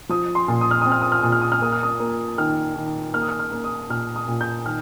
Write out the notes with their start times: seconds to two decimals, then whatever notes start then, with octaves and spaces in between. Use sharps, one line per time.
0.09 F3 D#6
0.35 C6
0.48 A#2
0.61 D#6
0.71 F6
0.82 C4 D#6
0.92 F6
1.02 D#6
1.12 F6
1.22 A#2 D#6
1.32 F6
1.42 D#6
1.52 F6
1.62 A#3 D#6
1.72 F6
1.83 D#6
2.00 A#3
2.38 D#3 F6
2.75 D#3
3.14 A#3 F6
3.22 D#6
3.29 F6
3.39 F6
3.52 A#3
3.64 D#6
3.89 A#2 F6
4.16 D#6
4.28 A#2
4.41 G6
4.66 D#3 F6